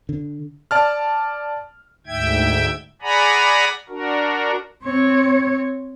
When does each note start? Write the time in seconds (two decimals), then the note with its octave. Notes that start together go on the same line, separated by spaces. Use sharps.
0.09 D3
0.71 D5 A5 F6
2.07 D2 G#2 E5 G5 G#6
3.02 G#4 D5 F#5 G#5 A#5 B5
3.89 D4 F#4 A#4
4.83 C4 C#5